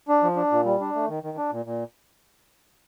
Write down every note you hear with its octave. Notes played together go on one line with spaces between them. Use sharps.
D4
F3
D4
A#2
G3
D4
A3
D#3
D#3
D4
A#2
A#2